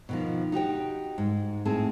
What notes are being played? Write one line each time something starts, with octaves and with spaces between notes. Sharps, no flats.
B2 D#3 F3
D#4 F#4 G4 G5
G#2
A2 C4 G#4 A5